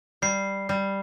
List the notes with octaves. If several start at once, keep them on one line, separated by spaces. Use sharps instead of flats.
G3 C7
G3